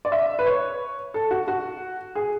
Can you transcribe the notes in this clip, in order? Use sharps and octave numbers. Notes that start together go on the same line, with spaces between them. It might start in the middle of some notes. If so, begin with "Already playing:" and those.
D5
E5
B4
C#5
A4
F#4
F#4
G#4